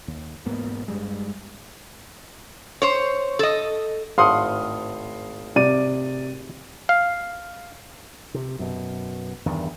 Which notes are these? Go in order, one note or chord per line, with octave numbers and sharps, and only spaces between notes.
D#2
E1 G#2 A#3 B3
G2 G3 G#3
C5 C#5
A4 D#5
G#1 A2 F5 F#5 C6 D#6
C3 D5 D#7
F5
C3
F#2 B2
E2 G2 D#3